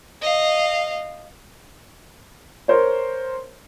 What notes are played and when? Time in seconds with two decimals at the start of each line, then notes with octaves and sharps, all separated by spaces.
0.22 D#5 F5
2.68 A#4 C5 C#5